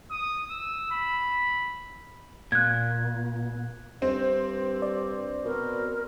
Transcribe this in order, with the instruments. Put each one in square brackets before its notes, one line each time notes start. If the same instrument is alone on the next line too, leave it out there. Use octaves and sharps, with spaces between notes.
[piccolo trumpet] D#6
E6
B5
[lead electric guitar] A#2 [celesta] F#6 G#6
[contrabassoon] G2 [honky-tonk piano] C4
[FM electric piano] D5
[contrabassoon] B2 [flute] A#4